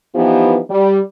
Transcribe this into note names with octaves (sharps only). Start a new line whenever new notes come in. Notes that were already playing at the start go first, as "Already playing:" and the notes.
E3 F3 B3 D#4 G4
G3